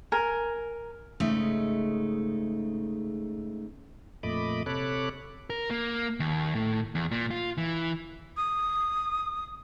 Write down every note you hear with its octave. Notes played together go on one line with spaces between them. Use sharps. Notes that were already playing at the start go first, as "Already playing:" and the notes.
A#4 G#5
G#2 C#3 A3 D#4
F2 A#2 A3 D#5 B5 D6
C3 A4 C#5 B5 D6 F#6
A#4
A#3
D#2
A2
E2
A#2
F4
E3
D#6